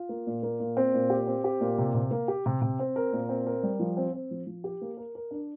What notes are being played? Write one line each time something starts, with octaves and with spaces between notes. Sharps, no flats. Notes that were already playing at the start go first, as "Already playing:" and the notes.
Already playing: F4
A#3
A#2
A#3
A#2
C4
A#2
G4
C4
G4
A#2
C3
C3
A#3
G4
C3
C3
C4
A#4
A#2
C4
A#4
G3
F3
C4
C4
F3
F3
G4
A#3
A#4
A#4
D4